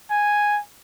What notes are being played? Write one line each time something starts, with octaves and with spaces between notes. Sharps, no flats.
G#5